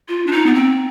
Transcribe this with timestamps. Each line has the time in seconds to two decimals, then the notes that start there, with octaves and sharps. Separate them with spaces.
0.08 F4
0.27 D4
0.32 D#4
0.46 B3
0.54 C4